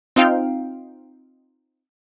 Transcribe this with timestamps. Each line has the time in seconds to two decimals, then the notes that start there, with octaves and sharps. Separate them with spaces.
0.16 C4 D#4 F4 F5 G5